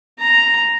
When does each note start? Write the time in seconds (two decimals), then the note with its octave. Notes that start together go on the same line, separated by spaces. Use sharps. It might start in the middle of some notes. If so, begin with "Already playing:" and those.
0.19 A#5